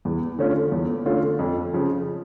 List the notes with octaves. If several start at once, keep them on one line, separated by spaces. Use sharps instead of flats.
E2
D3 A3 C#4 F4
E2
D3 A3 C#4 F4
F2
C#3 F3